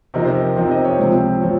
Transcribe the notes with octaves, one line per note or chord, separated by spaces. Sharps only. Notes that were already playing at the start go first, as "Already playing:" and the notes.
C3 F3 C4 D#4 A#4
C5
A#4
C3 F3 C4 D#4
D#5
C#5
C#2 C3 F3 C4 C5
C3 F3 C4 C#5